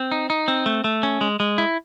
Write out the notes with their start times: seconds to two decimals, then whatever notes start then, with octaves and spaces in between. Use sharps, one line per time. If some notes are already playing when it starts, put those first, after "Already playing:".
Already playing: C4
0.12 D#4
0.30 D#4
0.48 C4
0.66 A3
0.84 A3
1.03 C#4
1.21 G#3
1.40 G#3
1.58 E4